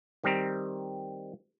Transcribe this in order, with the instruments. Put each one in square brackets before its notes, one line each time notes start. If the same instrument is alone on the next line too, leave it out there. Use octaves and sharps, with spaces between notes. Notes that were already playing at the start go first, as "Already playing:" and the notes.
[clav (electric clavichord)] D#3 G3 C4 G4 A#5